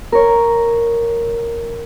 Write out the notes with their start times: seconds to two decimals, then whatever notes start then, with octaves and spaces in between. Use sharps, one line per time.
0.12 A#4 C#5